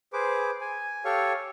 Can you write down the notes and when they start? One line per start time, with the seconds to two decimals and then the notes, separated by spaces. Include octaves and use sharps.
0.13 G#4 B4 C5 D6
0.61 G#5
1.05 G4 A4 C#5 F5 C#6